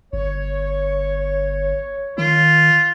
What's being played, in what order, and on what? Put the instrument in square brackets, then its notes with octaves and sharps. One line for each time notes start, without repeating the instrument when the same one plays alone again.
[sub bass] G1 [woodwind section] C#5
[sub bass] D#3 [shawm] F4